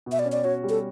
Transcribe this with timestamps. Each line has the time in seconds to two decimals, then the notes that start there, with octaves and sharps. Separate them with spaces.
0.06 B2
0.12 E5
0.19 D5
0.25 C#4
0.32 D5
0.44 F#4 C#5
0.63 G3
0.69 A4